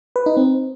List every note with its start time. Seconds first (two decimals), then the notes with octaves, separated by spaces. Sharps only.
0.16 B4
0.26 D#4
0.37 C4